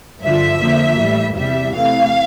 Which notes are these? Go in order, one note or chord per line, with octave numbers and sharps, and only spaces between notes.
G2 D3 F3 E5
F2 D3 F3 A#3
A2 E3 G3
E2 C3 G3 E5
C3 E3 A3 F5